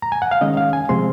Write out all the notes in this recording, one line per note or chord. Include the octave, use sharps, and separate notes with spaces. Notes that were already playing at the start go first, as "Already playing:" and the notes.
A#5
G#5
F#5
F5
D#3 G#3 C#4 D#5
F5
G#5
C3 F3 G#3 C4 C6